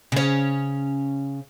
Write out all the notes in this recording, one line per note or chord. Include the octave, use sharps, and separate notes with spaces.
C#3 C#4